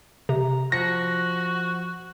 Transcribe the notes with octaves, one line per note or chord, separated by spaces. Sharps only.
C3 A#5
F3 F#4 A#6 C#7